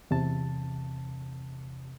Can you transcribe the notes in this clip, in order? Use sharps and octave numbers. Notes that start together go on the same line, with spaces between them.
E2 C3 A5